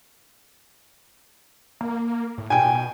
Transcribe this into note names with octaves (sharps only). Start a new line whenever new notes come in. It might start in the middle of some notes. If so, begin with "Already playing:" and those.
A#3
A2
B2 G5 G#5